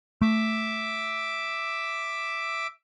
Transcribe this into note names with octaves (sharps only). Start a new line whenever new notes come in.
A3 E5 D6